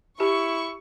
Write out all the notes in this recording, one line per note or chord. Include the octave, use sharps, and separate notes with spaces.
E4 G4 C#6